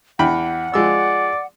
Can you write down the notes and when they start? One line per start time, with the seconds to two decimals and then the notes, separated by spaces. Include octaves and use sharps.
0.19 E2 F#5 G5 B5
0.74 F3 G#3 D5 E6